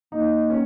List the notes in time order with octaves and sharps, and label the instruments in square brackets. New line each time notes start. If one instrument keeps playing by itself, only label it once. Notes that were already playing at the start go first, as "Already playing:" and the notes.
[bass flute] A#3 [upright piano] D#4
[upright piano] C#4